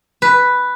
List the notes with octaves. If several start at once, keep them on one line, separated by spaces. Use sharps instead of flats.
B4